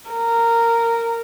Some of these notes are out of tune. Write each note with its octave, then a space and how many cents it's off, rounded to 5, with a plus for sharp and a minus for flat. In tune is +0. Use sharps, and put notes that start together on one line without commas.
A#4 -10